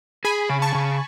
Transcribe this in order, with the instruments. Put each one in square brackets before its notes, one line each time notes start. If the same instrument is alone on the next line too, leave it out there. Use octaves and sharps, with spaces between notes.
[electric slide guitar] G#4 [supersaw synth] G#5 B5
[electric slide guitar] C#3
[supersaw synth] A5 C#6
[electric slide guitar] C#3